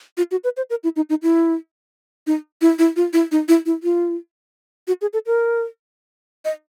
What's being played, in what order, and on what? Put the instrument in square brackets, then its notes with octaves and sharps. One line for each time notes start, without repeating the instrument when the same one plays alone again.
[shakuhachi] F4
F#4
B4
C5
A#4
E4
D#4
D#4
E4
D#4
E4
E4
F4
E4
D#4
E4
E4
F4
F#4
G#4
A4
A#4
D#5